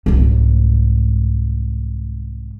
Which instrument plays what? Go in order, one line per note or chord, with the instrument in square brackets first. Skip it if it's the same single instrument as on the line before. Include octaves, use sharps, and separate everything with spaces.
[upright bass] C2 G#2